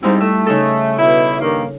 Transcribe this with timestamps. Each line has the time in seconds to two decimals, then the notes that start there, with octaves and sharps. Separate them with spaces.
0.03 G#2 G3 C4 D#4 E4
0.20 A3 E5
0.46 C#3 D#4 A4
0.99 B2 E4
1.40 G2 D#3 A#3